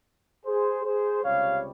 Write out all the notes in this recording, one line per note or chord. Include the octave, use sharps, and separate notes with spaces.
G#4 C5
G#4 C5
C#2 C3 G3 C#5 F5